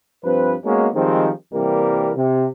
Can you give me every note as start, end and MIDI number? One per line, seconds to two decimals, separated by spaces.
0.24 0.55 43
0.24 0.55 53
0.24 0.55 60
0.24 0.55 71
0.64 0.88 56
0.64 0.88 58
0.64 0.88 59
0.64 0.88 61
0.64 0.88 63
0.64 0.88 66
0.94 1.30 51
0.94 1.30 53
0.94 1.30 55
0.94 1.30 56
0.94 1.30 60
1.53 2.11 36
1.53 2.11 48
1.53 2.11 52
1.53 2.11 55
1.53 2.11 58
1.53 2.11 70
2.16 2.47 48